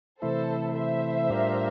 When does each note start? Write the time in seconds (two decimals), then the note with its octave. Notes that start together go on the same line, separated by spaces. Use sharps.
0.22 C3 E3 A3 E4 A4 C5
0.76 C5 E5
1.30 A2 G3 D4 F4 A#4